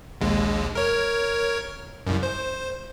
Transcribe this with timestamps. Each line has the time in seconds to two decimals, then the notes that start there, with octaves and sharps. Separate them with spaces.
0.21 A#1 D#2 G#3
0.75 A#4 C#5
2.07 C2 F#2
2.23 C5